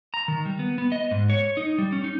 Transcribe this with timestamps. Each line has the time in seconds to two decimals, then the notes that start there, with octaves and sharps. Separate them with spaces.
0.14 A#5
0.28 D#3
0.45 G3
0.59 B3
0.78 B3
0.92 D#5
1.11 G#2
1.30 C#5
1.57 D#4
1.78 G3
1.93 C#4
2.04 D#4